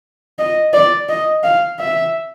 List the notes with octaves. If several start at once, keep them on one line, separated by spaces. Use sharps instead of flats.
D#5
D5
D#5
F5
E5